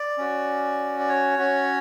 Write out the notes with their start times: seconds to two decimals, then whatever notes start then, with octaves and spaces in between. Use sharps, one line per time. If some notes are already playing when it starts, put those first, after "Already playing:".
Already playing: D5
0.18 C#4 F#4
0.99 D5
1.09 C#5
1.39 C#4 F#4